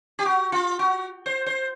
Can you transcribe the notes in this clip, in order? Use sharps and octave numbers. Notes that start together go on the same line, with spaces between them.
G4
F#4
F4
F#4
C5
C5